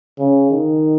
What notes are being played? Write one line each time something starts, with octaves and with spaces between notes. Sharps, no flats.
C#3
D#3